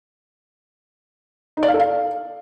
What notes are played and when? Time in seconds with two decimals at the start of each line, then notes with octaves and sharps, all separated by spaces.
1.57 D#4
1.63 D5
1.68 F5
1.74 A4
1.80 F5